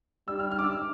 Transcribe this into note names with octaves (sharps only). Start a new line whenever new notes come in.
G3 E6
F6
F6
D6
E6